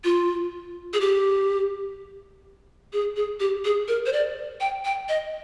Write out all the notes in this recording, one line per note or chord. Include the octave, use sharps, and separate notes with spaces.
F4
G#4
G4
G#4
G#4
G4
G#4
A#4
C5
D5
G5
G5
D#5